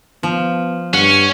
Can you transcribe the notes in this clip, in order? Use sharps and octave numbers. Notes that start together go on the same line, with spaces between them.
F3 B3
G2 C#4 F#5